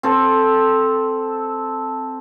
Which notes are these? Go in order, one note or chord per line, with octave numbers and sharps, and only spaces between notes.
C4 A4